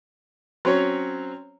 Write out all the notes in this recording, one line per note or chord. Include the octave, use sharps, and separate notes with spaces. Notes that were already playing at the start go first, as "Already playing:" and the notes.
F#3 C4 C#4 C#5